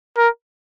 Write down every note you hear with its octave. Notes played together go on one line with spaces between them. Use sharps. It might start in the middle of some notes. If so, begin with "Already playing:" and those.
A#4